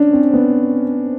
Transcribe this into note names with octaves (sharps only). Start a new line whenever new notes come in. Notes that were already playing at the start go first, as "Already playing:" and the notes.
Already playing: C#4 D4
C4
B3